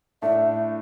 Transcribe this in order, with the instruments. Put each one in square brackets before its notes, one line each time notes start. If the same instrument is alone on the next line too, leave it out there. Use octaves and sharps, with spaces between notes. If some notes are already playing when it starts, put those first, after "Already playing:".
[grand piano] A2 A3 D4 [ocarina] E5